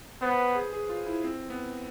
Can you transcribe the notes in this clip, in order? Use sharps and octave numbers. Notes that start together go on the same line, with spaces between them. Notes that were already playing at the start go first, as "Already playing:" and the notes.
B3 C5
B4
G#4
G#4
F4
E4
C4
B3